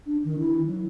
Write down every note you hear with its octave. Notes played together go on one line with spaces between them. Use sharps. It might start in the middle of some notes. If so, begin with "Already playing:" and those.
D4
D#3
E4
F#3